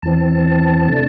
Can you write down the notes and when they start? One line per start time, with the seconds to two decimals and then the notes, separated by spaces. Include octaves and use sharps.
0.02 E2 E3 C4 A5
0.88 C3 A3 D4